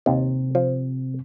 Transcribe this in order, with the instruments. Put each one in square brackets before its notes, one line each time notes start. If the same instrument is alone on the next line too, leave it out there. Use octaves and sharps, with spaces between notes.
[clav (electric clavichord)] D#2 [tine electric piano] C3 C4
[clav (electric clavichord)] F3